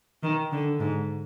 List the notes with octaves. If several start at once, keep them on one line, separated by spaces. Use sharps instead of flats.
D#3
D3
G#2